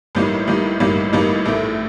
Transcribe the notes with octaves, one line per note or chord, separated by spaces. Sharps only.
A1 A2 G3 A#3 D#4
A1 A2 G3 A#3 D#4
A1 A2 G3 A#3 D#4
A1 A2 G3 A#3 D#4
A#1 A2 A3